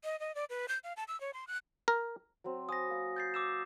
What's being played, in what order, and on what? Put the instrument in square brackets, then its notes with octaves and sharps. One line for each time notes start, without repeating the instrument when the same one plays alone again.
[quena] D#5
D#5
D5
B4
G6
F5
A5
E6
C#5
C6
F#6
[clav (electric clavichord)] A#4
[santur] F#3 C4
[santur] G#5 B5 [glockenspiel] D#6 A#6
[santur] A#3 G#5
[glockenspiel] G6 A6 C7
D6 E6 E7